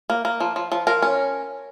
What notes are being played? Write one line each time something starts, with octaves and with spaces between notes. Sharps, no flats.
A#3
A#3
F3
F3
F3
F3 A#4
C#4